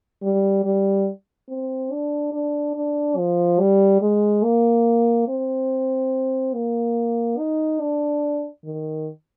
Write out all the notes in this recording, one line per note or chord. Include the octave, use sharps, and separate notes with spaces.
G3
G3
C4
D4
D4
D4
F3
G3
G#3
A#3
C4
A#3
D#4
D4
D#3